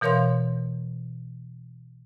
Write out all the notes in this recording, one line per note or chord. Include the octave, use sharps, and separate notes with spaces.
B2 E3 A#4 C#5 F5 C6